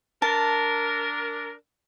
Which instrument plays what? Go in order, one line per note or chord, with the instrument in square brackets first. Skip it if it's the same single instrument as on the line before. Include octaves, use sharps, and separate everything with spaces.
[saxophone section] D4 A#4 [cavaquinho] A5